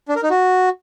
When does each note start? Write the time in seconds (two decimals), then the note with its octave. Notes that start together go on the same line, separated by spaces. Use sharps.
0.08 D4
0.16 A#4
0.23 D#4
0.30 F#4